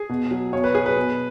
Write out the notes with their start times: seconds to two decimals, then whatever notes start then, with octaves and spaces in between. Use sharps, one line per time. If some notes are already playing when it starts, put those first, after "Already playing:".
Already playing: G#4
0.09 B2
0.31 F#3
0.52 B2 C#5
0.64 B4
0.75 F#3 G#4
0.86 B4
0.96 B2